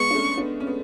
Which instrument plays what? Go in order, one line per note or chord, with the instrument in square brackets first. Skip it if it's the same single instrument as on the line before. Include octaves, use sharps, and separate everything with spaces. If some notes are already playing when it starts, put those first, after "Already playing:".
Already playing: [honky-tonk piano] G#3 B3 [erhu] C#6
[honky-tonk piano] D4
A3 C#4
B3 D4
C#4
B3